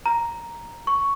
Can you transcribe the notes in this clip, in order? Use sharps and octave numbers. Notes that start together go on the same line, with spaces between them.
A#5
C#6